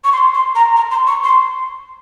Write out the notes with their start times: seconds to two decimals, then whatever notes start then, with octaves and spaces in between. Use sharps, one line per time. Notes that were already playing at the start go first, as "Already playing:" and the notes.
0.04 C#6
0.12 C6
0.34 C6
0.55 A#5
0.76 A#5
0.91 C6
1.07 C#6
1.24 C6